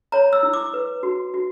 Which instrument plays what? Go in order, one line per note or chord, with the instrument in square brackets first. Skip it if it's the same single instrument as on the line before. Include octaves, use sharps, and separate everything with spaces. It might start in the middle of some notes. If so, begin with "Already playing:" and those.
[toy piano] C#5 A#5
E6
E4
D6
B4
F#4
F#4